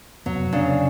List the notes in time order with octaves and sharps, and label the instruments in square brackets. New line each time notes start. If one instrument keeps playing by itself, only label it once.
[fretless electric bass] F1 F#2 B3 [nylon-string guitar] F#3
[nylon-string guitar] C#3 D4